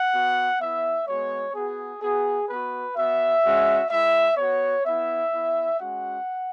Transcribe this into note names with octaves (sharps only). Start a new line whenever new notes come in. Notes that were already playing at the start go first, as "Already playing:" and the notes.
Already playing: F#5
B3 F#4
B3 E4 E5
G#3 B3 F#4 C#5
B3 F#4 G#4
B3 F#4 G#4
B3 F#4 B4
B3 F#4 E5
G#3 C#4 F#4
G#3 E4 E5
B3 F#4 C#5
B3 E4 E5
B3 E4
G#3 C#4 F#4 F#5